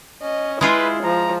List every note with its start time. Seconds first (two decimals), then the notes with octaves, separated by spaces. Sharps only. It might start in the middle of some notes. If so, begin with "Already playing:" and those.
0.23 C#4 D#5
0.61 G#3 E4 F4 G#4 B4
1.04 F3 A#5